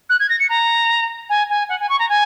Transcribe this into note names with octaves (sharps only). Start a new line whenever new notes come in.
F#6
G#6
A#6
C#7
A#5
G#5
G#5
F#5
G#5
C#6
A#5
G#5